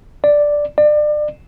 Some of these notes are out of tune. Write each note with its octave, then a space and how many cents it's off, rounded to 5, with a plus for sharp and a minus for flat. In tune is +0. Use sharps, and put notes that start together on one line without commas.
D5 +0
D5 +30